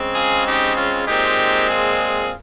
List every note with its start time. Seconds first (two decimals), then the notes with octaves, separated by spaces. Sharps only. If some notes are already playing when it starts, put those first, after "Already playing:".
Already playing: C#3 G#3 C4
0.15 F4 G#4
0.45 D#4 G4
0.76 C#4 F4
1.06 A#2 G#3 C4 D#4 G4
1.68 F4 G#4